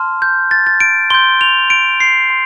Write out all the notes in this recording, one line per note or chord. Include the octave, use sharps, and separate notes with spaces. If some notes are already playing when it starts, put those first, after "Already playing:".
Already playing: A5 C6 F6
G6
A6
A6
D7
C6 G6 G7
F7
D7
C7
C6